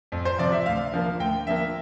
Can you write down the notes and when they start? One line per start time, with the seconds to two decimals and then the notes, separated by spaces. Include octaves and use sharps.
0.12 F2
0.25 C5
0.38 C3 F3 D5
0.52 E5
0.66 D2 F5
0.93 D3 F3 A#3
1.20 D2 G5
1.47 D3 F3 A#3 E5